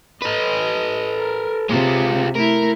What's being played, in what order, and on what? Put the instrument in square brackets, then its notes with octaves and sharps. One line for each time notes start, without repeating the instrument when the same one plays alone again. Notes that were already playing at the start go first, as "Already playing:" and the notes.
[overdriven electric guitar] A4 B4 [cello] D#5
[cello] A#4
[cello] C3 [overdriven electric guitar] G#3 F4
[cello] A3 E4 [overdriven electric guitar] A#4